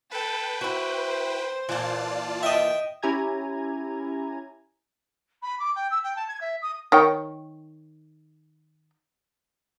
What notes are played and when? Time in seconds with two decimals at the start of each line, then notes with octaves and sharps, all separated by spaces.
0.11 A4 B4 G5
0.61 E4 F#4 C5
1.69 A#2 E3 F4 D5 A5
2.43 D#5 E5 G5
3.02 C#4 E4 G4 G#5 A#5 G#6
5.42 B5
5.59 D6
5.75 G5
5.90 E6
6.03 G5
6.15 A5
6.28 G#6
6.40 E5
6.61 D#6
6.92 D#3 C#5 G5